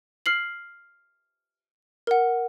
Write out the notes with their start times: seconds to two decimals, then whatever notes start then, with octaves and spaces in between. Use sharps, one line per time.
0.26 F6 C7 F#7
2.07 A#4 F#5